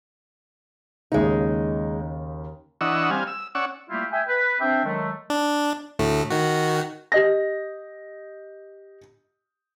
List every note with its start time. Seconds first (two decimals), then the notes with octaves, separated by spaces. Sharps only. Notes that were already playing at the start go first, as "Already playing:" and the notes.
1.12 D#2 C#3 G#3 D#4
2.81 E3 D4 D#5 F#5 C#6 E6
3.11 G3 C4 F5 G#5
3.27 E6
3.55 C#4 D5 F#5 C#6 E6
3.90 G3 A3 A#3 E4 F4 G4
4.12 E5 G5 G#5
4.27 B4
4.60 C4 D4 C5 E5 G5
4.84 D#3 F#3 G#3 A3
5.30 D4
5.99 D2 A2 A3
6.30 D#3 F#4
7.12 G4 D#5 A#6